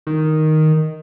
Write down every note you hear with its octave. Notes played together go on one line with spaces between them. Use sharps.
D#3